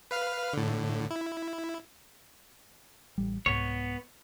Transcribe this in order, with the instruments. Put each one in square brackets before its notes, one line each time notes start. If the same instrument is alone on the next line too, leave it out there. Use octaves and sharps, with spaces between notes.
[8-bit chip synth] B4 F5 F6
A2 D3
E4
[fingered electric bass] A1 G3
[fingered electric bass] C2 G#2 [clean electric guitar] B3 C#5